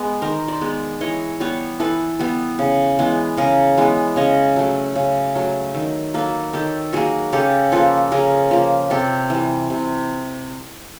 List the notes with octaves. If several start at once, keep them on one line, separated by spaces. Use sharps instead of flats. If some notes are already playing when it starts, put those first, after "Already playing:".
Already playing: G#3 B3
D#3 A#4 C5
C5 D5
G#3 B3
E3 C#5 D#5
G3 B3 B4 C#5
E3 A4 B4
G3 B3
C#3
E3 G#3 B3
C#3 G#4 A#4
E3 G#3 B3
C#3 C#5 D#5
F#3 A3
C#3
F#3 A3
D#3
F#3 A#3 A4 B4
D#3 G4 A4
F#3 A#3 F#4 G#4
C#3 G4 A4
F3 A#3 A4 B4
C#3 G#4 A#4
F3 A#3
C3 G4 A4
E3 G3
C3